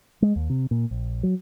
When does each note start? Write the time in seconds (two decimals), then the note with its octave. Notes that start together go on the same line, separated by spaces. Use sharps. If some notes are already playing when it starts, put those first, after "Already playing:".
0.22 G#3
0.36 D#2
0.50 C3
0.71 A#2
0.91 A#1
1.23 F#3